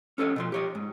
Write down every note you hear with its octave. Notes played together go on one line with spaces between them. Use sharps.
C#4 A4 C#5 D#5
B2 F3 C6
G4 C#5 D#5
G#2